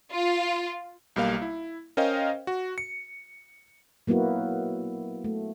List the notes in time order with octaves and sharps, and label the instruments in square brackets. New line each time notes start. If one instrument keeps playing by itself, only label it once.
[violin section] F4
[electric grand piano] B1 G3 A#3 F5
E4
C#4 A#4 C5 D#5 F5 G5
F#4
C#7
[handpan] F#3 A#3 B3 E4 F#4
A3